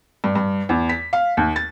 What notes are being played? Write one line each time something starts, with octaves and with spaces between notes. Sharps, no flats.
G2
G2
E2
B6
F5
D#2
A6